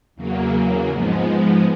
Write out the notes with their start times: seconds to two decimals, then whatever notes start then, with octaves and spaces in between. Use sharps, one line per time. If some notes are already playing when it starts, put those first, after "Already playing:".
0.16 E2 C#3 F#3 A#3
0.90 G#2 F3 G#3 B3